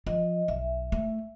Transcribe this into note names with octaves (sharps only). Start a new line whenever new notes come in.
F3 D#5
B1 E5
A3